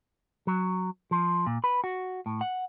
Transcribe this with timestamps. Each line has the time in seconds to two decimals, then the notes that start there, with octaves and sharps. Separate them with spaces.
0.47 F#3
1.11 F3
1.47 A#2
1.64 B4
1.84 F#4
2.26 A2
2.41 F#5